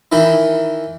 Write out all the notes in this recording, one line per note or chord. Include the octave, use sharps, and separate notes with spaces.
D#3 E3 D#4 E4